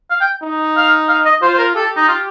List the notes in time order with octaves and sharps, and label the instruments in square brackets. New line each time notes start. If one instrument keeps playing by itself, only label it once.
[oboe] F5
G5
[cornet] D#4
[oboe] F5
F5
D#5
[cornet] F4 [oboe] C5
[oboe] C5
A#4
[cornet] G4 [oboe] A4
[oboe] D#4
F4